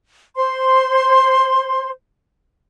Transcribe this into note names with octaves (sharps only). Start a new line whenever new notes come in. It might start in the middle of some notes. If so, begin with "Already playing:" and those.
C5 C6